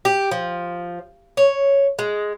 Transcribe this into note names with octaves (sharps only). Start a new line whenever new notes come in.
G4
F3
C#5
G#3